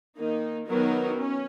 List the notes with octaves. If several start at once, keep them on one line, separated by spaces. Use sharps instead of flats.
D#3 A#3 D#4
D#3 F#3 B3 D#4 A#4
C#4